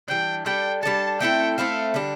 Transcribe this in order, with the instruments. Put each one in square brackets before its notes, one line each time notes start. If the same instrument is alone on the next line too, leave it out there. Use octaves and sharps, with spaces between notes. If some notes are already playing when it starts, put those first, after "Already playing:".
[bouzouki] E3 G3 D4 [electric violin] G5
[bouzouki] G3 D4 A4 [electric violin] G5
[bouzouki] G3 D4 A4 [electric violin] A5
[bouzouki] A3 C4 E4 A4 [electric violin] G5
[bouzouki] A3 C4 E4 A4 [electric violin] F5
[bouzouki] D3 G3 D4